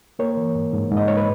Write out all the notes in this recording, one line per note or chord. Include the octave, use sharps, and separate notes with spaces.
A#3 A#4 C#5
E3
G#2
G#2
G#2
D#5
C#5
B4